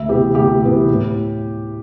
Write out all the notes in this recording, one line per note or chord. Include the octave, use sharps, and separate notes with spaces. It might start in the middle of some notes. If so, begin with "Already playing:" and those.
Already playing: D2 E5
C3 E3 B3 G4
D2 G4
C3 E3 B3
A2